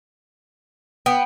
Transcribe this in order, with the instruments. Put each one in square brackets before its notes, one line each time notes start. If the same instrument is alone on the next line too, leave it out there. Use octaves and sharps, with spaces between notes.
[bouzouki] B3 [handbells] G5